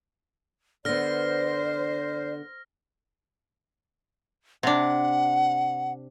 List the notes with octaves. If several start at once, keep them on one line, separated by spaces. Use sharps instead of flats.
D3 B3 C5 D5 F6 A#6
C3 D4 F#5